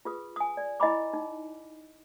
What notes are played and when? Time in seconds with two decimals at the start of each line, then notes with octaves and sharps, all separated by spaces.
0.05 F4 G#4 B4 D#6
0.36 G#5 D#6
0.57 D5
0.80 E4 D#5 G#5 B5 D6
1.13 D#4